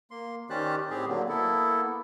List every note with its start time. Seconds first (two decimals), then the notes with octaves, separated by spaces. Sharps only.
0.11 A#3 C6
0.50 D#3 C#4 G4 C5 D5 F#6
0.90 A2 C4 G4 G#4
1.08 D3 F#3 A#3
1.29 A#3 B3 E4 A4